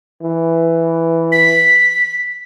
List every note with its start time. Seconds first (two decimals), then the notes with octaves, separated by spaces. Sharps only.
0.22 E3
1.32 B6